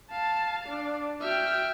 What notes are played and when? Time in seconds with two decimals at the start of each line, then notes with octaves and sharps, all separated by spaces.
0.12 F5 A5
0.69 D4
1.21 F#4 E5 G5 F6